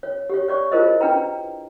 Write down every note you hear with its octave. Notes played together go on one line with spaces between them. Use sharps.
C#5
G4 C#5
C#5 D5 C#6
E4 F4 G#4 A#4 C5 D#5
D4 B4 G5 A#5